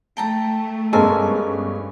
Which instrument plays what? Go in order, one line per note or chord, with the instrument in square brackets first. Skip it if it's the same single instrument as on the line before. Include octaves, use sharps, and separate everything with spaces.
[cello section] A3 [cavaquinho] G5 A5 A#5
[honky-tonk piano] G2 B3 C#4 [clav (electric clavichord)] G#3 A4 A#4 [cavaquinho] G#5